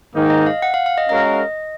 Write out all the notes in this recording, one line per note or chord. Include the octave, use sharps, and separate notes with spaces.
G#2 D#3 A#3 D#4
D#5
F5
F#5
F5
F5
D#5
G#3 C#4 F#4 A#4 D#5 F5